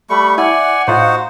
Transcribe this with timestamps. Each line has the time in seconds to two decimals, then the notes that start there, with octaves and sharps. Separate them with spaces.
0.10 G3 A3 B5 C#6
0.38 E4 D5 F#5 G#5
0.88 A2 D#4 F4 F#4 C5